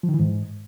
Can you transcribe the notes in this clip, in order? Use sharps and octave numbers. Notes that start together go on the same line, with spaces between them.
F3
D#3
E3
G#2